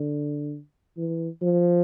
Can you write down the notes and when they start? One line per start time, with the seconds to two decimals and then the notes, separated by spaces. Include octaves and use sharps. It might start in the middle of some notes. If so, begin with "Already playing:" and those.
Already playing: D3
0.97 E3
1.42 F3